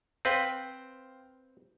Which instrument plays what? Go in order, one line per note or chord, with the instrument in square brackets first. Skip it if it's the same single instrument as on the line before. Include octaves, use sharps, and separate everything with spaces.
[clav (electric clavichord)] C4 B4 [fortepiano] C5 F5 G5